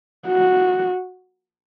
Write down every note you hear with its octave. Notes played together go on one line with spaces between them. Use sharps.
F#4